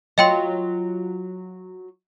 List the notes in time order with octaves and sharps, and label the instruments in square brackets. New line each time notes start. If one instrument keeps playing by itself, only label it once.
[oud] F#3 F4 [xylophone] D#5 G5 C6